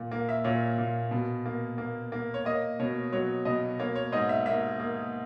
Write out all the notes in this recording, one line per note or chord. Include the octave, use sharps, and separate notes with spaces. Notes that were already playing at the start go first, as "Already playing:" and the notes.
Already playing: A#2
A#3
E5
A#2 C#5
A#2
B2
A#3
A#3
A#3
C#5
A#3 D#5
B2 C#5
F#3 C#5
B2 D#5
A#3 C#5
C#5
G#2 D#5
E5
A#3 E5
A#3